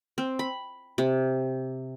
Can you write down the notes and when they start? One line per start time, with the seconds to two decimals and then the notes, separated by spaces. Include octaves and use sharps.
0.18 C4
0.39 B5
0.98 C3